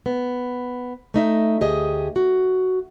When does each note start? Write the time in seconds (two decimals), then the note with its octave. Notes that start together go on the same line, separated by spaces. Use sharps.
0.06 B3
1.14 A3 D#4 E5
1.61 D2 G4 G#4 D#5
2.16 F#4